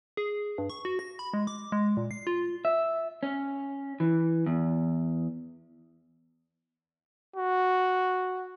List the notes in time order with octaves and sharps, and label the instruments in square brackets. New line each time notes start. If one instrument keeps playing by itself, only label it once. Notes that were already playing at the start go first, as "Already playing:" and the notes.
[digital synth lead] G#4
G2
C#6
F#4
A#6
B5
G#3
D6
G#3
A#2
C7
F4
[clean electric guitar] E5
C#4
E3
E2
[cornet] F#4